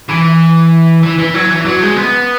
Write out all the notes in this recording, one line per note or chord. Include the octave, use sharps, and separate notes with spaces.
E3
E3
E3
F#3
E3
F#3
G#3
B3